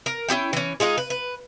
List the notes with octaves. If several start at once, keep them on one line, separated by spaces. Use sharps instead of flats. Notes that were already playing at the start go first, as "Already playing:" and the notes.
A#4
C#4 E4 G4 G5
E3 C#4
G#3 D#4 F4 G#4
B4
B4